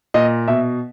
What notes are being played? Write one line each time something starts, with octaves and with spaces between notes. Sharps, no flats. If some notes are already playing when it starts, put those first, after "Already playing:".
A#2 D#5
B2 E5